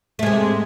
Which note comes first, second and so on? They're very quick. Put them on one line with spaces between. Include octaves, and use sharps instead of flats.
A3 G#3 C3